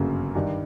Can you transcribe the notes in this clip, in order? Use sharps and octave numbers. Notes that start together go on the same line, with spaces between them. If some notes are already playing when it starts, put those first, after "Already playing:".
Already playing: G1 F#2 C#3 F#3 A#3
G2 D#3 G3